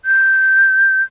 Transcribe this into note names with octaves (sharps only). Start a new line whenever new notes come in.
G6